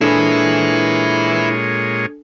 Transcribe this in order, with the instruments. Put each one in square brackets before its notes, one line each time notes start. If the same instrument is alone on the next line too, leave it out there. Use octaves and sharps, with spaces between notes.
[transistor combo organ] A#2 G#3 C#5 [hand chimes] D4 A4 [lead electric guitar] E4 B4